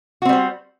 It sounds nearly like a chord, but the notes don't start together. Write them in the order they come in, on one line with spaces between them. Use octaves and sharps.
F#4 C4 G3 C5